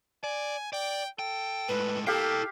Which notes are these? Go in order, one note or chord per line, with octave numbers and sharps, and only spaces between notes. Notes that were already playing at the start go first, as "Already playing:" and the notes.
D5 G#5
D5 G5
A4 G5
A2 G#3 B4
A#3 E4 G4 A4 F5 G5